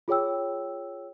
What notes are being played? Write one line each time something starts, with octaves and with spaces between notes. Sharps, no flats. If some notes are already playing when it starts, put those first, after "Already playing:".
F4 G#4 C#5 G5 E6